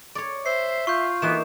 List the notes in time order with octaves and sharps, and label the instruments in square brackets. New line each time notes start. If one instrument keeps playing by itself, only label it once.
[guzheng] C#5 D5
[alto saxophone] C5 [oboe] E5 [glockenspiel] C7
[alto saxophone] F4 [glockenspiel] C#6 G6
[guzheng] E3 A#3 D#4 [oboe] B3 [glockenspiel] E7